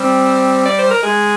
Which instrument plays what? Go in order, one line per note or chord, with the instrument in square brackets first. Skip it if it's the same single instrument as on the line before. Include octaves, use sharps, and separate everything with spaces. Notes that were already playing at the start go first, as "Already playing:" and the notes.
Already playing: [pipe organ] G3 [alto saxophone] C4
[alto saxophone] D5
C5
A#4
[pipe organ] G#3 [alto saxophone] G#4